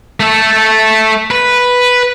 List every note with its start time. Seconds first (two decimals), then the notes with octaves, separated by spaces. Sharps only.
0.20 A3 A4
1.31 B4